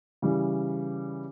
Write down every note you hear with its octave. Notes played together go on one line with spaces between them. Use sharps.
C#3 E3 G3